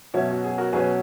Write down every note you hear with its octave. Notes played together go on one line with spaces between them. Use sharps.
B2 F#3 C#4 C#5 E5
F#4
G#4
F#4 A#4
B2 F#3 C#4 G#4 B4